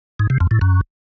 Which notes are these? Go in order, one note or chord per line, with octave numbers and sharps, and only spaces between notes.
G#2
C3
F2
A2
F#2